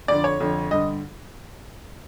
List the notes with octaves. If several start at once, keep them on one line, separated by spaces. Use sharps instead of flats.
F2 D3 D5
C#5
F2 D3
G2 D3 D#5